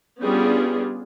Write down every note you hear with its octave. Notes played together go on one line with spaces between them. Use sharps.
G3 B3 C#4 D4 F4 G#4